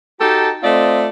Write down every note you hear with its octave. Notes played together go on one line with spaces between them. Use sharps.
D#4 F#4 G4 A4 A5
A3 C4 F4 D5 D#5